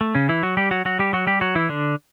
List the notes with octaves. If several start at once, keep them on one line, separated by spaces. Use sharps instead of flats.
A3
C#3 C#4
E3 E4
F#3 F#4
G3 G4
F#3 F#4
F#3 F#4
G3 G4
F#3 F#4
G3 G4
F#3 F#4
E3 E4
D3 D4